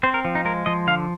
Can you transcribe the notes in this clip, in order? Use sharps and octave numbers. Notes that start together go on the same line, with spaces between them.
C4 C5
A#4
F3
D#4
G#3 A#4
F3 D#5
D3 F5